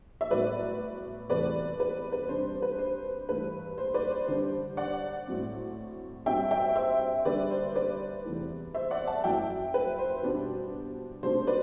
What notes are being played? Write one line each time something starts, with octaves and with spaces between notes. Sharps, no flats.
E5
A2 F#3 B3 B4 D5
E2 C3 E3 A3 B4 D5
B4
B4
C3 G3 D4 C5
B4
C5
G2 E3 A3 B4
C5
B4 D5
C5
D3 G3 D4 C5
D5 F#5
A2 F#3 C4
G2 F#3 C4 E5 G5
E5 G5
C5 E5
D3 G3 B3 D4 B4 D5
C5
B4 D5
E2 C3 E3 A3 E4
C5 E5
D5 F#5
F#5 A5
F#2 F#3 A3 E4 E5 G5
B4
C5
B2 G3 B3 D4
C3 F#3 A3 D4 C5
B4 D5